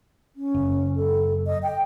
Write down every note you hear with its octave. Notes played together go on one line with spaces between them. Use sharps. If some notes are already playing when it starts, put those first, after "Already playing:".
C#4
F#1
A4
D#5
G5